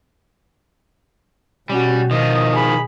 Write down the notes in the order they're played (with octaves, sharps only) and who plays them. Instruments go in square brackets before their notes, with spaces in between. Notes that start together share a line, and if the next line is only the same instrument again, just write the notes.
[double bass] B2 [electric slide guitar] G3 [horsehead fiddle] C#4 F#4
[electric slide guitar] D#3 F3 [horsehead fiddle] D#5
[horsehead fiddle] G#4 B5